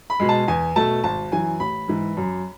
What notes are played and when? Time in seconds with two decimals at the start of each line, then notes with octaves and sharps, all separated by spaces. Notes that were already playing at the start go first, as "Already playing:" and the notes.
0.10 B5
0.20 B2 G#3
0.29 A5
0.48 E2 G#5
0.76 B2 A3 A5
1.04 G#1 A5
1.32 F#2 E3 G#5
1.60 A1 B5
1.88 G#2 E3
2.17 F#2